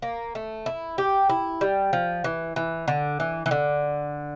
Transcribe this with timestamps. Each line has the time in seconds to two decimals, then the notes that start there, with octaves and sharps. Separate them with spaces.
0.02 A#3
0.35 A3
0.66 E4
0.98 G4
1.29 E4
1.61 G3
1.93 F3
2.24 E3
2.56 E3
2.88 D3
3.20 E3
3.46 E3
3.51 D3